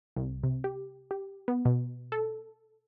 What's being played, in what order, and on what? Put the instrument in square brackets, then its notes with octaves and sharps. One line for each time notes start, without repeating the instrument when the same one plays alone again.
[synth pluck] C2
C3
G4
G4
B3
B2
A4